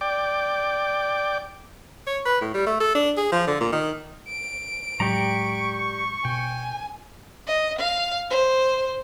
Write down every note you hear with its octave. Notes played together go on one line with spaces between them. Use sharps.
D5 G5 D6
C#5
B4
A2
G3
A3
A4
D4
G#4
F3
D3
A#2
D#3
D7
A2 F#3 G#3 G4 D5 A#5 C#6
B2 G5 G#5
D#5
F5
C5